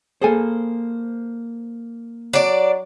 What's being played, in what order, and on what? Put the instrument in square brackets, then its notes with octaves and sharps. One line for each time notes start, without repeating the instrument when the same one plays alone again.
[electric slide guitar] A#3 C5 [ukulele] G#4 A4 G#5
[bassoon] F#3 [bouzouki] D4 D5